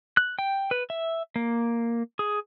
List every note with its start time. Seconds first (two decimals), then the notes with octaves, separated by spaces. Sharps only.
0.17 F#6
0.39 G5
0.71 B4
0.90 E5
1.36 A#3
2.19 G#4